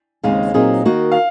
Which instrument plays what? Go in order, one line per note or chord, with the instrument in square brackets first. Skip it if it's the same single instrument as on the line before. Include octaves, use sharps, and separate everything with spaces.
[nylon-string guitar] D#2 C#3 G#3 C4 D#4 [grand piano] F5
[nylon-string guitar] A#2 F#3 C4 D#4 G#4
D#3 A#3 D#4 F#4
[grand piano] F5